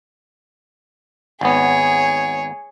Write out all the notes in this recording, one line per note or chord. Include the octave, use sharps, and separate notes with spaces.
G#1 B3 G#4 C#5